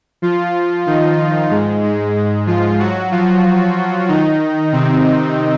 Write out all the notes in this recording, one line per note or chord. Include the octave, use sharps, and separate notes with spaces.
F3 F4
D#3 D#4
G#2 G#3
G#2 G#3
G#2 G#3
F3 F4
F#3 F#4
F3 F4
D#3 D#4
C3 C4
C3 C4